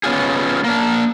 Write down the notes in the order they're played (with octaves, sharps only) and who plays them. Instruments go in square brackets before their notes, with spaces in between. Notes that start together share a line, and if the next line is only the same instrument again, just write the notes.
[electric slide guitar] B3 C#4 F4 G#4
A#3 D4